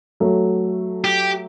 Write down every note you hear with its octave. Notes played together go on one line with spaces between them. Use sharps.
F#3 A3
G4